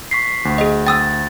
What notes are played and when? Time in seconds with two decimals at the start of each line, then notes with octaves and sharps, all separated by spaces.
0.11 C#6 B6 C7
0.45 D2
0.58 G#4 D#5
0.87 G5 D#6 E6 A6